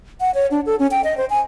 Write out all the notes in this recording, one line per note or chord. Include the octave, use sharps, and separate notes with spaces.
F#5
C#5
D4
A4
C#4
G5
D#5
C5
G#5